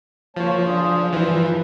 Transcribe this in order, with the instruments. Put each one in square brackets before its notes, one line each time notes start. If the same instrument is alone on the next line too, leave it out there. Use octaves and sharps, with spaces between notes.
[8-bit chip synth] F3 [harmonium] A#3 C#5 A5
[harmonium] D4 F4 G#4
[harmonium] G2 [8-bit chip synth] E3 F3